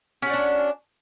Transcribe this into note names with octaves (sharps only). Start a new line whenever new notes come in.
C#4 D4 F#4 D5